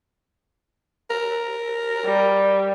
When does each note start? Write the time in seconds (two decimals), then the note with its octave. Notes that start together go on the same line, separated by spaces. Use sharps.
1.10 A#4
2.05 G3